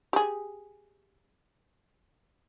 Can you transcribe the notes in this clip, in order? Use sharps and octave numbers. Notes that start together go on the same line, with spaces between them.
G4 G#4